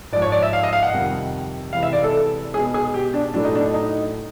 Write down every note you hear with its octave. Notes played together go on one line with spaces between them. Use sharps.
G#2 F3 G#3 D5
C#5
D5
E5
F5
D#5
F5
F#5
F2 C3 D#3 G3
C3 E3 G#3 F5
E5
D5
A4
B2 G#3 G#4
G#4
G4
D4
A2 F#3 A3 D4
D#4
D4
D#4